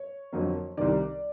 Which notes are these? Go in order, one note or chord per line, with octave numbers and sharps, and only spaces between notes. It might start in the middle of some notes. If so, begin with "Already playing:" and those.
Already playing: C#5
F2 D3 F#3 A#3
C2 C3 D#3 D5